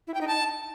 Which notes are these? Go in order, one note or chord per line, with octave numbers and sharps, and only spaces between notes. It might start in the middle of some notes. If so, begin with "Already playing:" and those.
E4
G5
D#4
A5